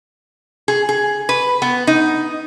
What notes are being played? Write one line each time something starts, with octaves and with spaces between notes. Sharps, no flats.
G#4
G#4
B4
B3
D#4